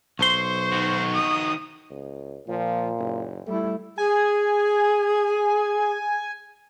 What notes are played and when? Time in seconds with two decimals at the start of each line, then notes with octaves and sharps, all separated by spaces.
0.19 B1 C5 C6 C#6
0.72 D#3 F#4
1.14 D#6
1.90 C#2
2.48 A#2 F3
2.99 F#1
3.47 G3 A3 E4
3.98 G#4 G#5